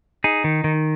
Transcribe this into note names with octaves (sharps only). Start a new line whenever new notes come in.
D#4 G#4
D#3
D#3